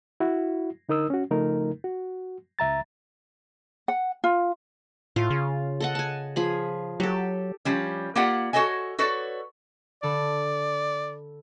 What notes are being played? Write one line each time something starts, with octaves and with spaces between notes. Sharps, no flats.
E4 F#4
D3 D#4 A#4 D#6 E6
C#4 F#4
C#3 F3 A3 D#4 A#4
F#4
C#2 E5 A#5 A6
F#5
F4
A2 F4
C#3
A4 D#5 F#5
G#5 A5
F3 G#4 B5
F#3 G4 A4
F3 G3 C#4
A#3 F4 G4 D5 F#5
F#4 A4 C#5 D#5 G#5
F#4 A4 B4 C#5 D5
D3 A4 D5 B5